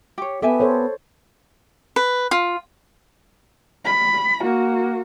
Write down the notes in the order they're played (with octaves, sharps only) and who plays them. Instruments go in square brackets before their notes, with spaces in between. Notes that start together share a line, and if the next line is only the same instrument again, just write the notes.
[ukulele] G4 C#5
[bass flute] B3 [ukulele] G4 E5 G#5 [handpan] A4
[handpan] A4 C5 C#5
[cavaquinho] B4
F4
[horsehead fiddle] B5
A#3 F#4